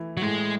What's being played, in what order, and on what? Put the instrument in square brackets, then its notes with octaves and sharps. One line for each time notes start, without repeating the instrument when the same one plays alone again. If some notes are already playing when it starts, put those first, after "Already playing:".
Already playing: [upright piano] E3 A3 E4
[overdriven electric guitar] F#3
[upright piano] A2 [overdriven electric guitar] G#3